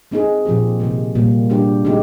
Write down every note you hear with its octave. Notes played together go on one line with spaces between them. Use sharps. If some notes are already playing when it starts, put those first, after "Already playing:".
G#3 C4 D#4 G#4
A#2 F3 C4 G4
C3 D#3 G#3
A#2 G3 A#3
G3 D4 G4
D#3 G#3 C4 D#4 G4